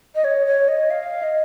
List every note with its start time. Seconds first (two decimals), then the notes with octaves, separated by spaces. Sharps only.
0.15 D#5
0.24 C#5
0.47 C#5
0.68 D#5
0.90 F5
1.23 D#5